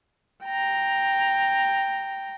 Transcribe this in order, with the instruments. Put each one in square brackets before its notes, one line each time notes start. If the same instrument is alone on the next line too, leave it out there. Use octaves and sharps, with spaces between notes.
[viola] G5 A#5